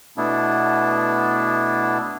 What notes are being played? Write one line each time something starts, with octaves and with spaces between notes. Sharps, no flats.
B2 A3 B3 D4 E4